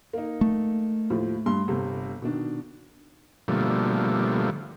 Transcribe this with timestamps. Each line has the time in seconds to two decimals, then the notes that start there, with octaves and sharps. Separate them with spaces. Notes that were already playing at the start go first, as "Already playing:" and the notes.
0.13 A#3 D#4
0.41 A3
1.10 D#2 A2 F3
1.46 G2 C6
1.68 G1 C3
2.22 B2 D#3 D4
3.48 B2 D3 F3 G3 A3 A#3